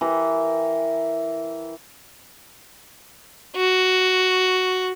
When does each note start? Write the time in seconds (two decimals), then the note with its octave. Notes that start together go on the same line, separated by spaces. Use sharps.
0.01 E3 G4 A#4
3.56 F#4